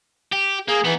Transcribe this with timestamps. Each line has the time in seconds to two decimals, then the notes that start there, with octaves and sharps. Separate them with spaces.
0.32 G4
0.68 A#3 G#4
0.84 E3 B3 D#4